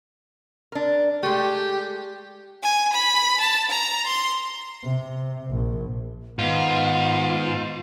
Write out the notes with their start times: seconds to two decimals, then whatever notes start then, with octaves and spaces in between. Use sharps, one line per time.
0.72 D4 A#4
1.23 G#3 A3 G4
2.63 G#5
2.93 B5
3.40 A5
3.70 A#5
4.07 C6
4.84 C3
5.51 A#1
6.39 G#2 D#3 B3 F4